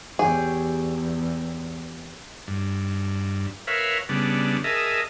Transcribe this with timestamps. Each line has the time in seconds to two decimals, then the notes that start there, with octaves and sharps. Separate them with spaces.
0.19 E2 G4 G#4 C#5 G5
2.47 G2
3.67 A#4 B4 C#5 E5 F5
4.09 C#3 G3 B3 D4
4.64 G#4 A#4 D#5 E5 A5